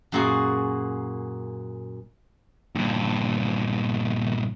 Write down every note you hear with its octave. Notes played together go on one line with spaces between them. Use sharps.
F#2 A#2 A#3 F#4 G#4
G2 A#2